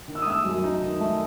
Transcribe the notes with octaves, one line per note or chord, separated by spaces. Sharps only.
D#3
E6
D#6
A3 E6
F#2
D#4
D#3
A3